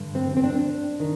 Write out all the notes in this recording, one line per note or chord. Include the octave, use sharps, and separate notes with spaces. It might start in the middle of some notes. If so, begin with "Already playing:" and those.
Already playing: G2 D3
C4
C4
D4
D#3